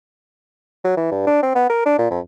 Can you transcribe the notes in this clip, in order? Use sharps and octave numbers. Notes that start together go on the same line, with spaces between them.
F#3
E3
G2
D4
C4
B3
A#4
D4
A#2
F2